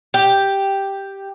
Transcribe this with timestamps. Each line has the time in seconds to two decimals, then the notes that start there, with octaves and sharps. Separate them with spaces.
0.14 G4